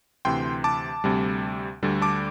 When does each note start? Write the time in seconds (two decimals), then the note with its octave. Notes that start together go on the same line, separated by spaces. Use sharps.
0.25 D2 C3 E3 G5 C6
0.64 A5 D6
1.04 D2 C3 G3
1.83 D2 D3 G3
2.02 A5 D6